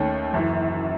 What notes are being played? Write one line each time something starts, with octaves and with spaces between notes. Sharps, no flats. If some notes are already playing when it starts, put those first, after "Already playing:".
Already playing: D#2 D#3 A3 C#4
F#1 F#2 E3